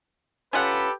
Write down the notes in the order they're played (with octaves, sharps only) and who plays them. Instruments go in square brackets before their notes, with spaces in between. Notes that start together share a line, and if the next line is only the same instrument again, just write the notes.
[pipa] C#4 F4 F#5 [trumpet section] G4 A4 B4